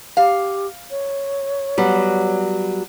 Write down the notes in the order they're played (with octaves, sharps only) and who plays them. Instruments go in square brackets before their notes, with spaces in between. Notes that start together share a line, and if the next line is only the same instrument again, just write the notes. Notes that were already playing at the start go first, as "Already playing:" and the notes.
[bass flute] G4 [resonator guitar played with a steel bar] F5
[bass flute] C#5
[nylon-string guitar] F#3 G3 B3